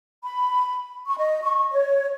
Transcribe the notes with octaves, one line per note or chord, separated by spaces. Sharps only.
B5
C#6
D#5
C#6
C#5